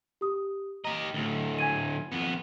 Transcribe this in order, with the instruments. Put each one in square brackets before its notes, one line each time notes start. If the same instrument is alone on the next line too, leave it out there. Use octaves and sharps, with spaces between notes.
[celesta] G4 D#6
[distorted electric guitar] G4 D#5 [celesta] A#5
[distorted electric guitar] D2 A2
[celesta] G#5 G#6 D#7
[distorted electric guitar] F2 B3